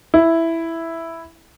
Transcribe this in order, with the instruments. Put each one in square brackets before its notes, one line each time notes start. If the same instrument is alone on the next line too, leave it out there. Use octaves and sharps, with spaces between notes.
[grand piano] E4